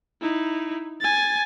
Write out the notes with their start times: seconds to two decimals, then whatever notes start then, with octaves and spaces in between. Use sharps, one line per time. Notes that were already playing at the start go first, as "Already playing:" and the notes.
0.21 D#4 E4
1.01 G#5 A6